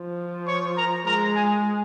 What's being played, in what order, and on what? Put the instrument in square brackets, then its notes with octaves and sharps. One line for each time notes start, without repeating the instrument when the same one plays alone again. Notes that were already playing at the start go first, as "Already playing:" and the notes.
Already playing: [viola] F3
[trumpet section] C#5 C#6
A#4 A#5
[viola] G#3 [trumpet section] A#4 A#5
[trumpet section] G#4 G#5